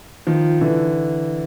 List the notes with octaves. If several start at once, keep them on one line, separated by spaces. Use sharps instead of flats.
D#3 F3
D3 E3